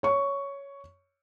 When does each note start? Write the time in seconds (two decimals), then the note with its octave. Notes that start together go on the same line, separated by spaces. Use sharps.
0.03 C#5 C#6